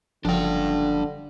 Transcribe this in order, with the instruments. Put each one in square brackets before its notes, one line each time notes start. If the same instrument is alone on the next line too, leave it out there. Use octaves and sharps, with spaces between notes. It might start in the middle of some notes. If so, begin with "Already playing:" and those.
[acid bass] F#1 [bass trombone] D3 [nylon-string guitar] F3 [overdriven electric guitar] D4 G5